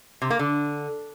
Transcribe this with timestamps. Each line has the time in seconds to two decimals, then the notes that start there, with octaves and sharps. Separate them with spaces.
0.22 C3
0.30 A#3
0.39 D3